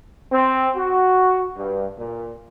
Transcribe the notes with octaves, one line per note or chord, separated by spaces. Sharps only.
C4
F#4
G2
A#2